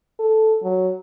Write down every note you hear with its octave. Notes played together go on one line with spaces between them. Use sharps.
A4
F#3